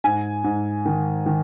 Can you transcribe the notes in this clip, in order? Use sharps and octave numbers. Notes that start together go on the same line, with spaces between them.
G#2 G#5
G#2
D#3
D#3